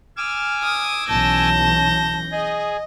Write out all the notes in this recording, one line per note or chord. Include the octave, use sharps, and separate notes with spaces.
G#5 D6 E6 F6
D#6
B1 E3 C#4 A5 G6 A#6
G#4 D#5